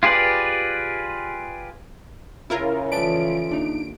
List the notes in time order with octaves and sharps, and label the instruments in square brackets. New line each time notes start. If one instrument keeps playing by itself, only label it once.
[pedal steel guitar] F4 G4 G#4 B4 D5
[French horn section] C#3 [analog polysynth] E4 F4 A#4
[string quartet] E3 F3 A3 [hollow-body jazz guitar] B4 D5 A5 [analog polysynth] D7
[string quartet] D#2 [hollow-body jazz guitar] D4 D#4